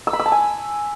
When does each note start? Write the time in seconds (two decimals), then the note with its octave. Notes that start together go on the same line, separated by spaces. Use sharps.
0.07 E6
0.13 B5
0.20 E6
0.26 A5
0.32 G#5